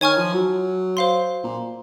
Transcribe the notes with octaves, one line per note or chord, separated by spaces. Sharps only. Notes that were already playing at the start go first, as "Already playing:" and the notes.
D#3 C#5 G#5 C#6 F6
F3
F#3
C5 F5 C6
A#2